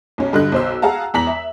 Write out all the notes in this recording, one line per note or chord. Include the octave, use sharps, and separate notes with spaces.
B1 C#4
G2 D3 D#5 F#6
B1 C5 E6
G#4 F5 F#5 A5 A#5
E2 A#5 B6 F#7
E5